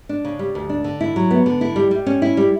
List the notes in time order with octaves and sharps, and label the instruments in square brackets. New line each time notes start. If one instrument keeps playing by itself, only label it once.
[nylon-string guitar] D4
C#3
G3
D2
D4
D3
E4
F#3
B3
D3
E4
G3
G3
C#4
E4
G3